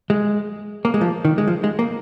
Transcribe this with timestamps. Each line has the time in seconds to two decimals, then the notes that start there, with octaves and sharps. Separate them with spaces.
0.10 G#3
0.85 A#3
0.94 G#3
1.01 F3
1.25 D#3
1.38 G#3
1.48 F3
1.64 G#3
1.79 A#3